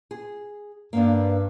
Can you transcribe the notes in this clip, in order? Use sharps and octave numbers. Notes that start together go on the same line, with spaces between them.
G#4
G2 A#3 B3 D4